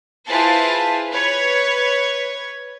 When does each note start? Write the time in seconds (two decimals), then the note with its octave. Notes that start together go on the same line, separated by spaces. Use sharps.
0.26 E4 F4 G#4 B4 C5 A5
1.10 B4 C#5 G#6